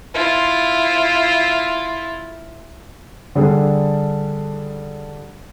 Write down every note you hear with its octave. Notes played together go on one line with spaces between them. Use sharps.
E4 F4
D3 G3 D4 G#4 A4